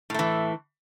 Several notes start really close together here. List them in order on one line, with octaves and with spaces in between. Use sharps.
A2 A3 E3